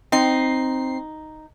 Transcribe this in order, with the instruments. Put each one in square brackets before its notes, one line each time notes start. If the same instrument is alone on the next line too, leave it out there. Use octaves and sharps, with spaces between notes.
[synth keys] C4 C7 [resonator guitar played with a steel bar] D#4